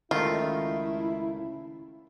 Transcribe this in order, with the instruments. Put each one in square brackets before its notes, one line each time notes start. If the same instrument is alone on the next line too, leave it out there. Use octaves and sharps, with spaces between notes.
[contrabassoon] C#2 [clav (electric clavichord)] D#3 A3 [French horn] E4 [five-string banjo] F4